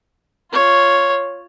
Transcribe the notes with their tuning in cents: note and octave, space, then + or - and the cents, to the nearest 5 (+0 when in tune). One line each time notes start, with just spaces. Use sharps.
F4 +0 C#5 +0